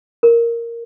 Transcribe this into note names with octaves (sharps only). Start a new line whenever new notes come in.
A#4